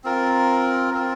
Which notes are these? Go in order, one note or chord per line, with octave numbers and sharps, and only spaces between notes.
C4 F4 A#4
C4 F4 A#4